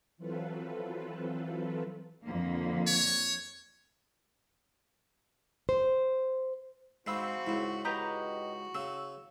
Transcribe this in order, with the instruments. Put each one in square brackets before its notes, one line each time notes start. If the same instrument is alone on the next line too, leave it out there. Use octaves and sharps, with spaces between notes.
[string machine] E3 F#3 C4 F4 A4 B4
[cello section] F2 D3 A#3
[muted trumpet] C#5
[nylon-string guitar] C5
[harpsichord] G#2 G#3 [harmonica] C4 F#4 [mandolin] F5 B5 E6
[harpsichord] C#2 G#2 [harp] E4
[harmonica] F#4 [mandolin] G4 B4 D#5 [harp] A#5 G6 B6
[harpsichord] C#3 [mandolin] E6